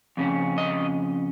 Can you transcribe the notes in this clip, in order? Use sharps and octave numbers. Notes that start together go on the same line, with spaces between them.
F2 C#3 C#4
D#5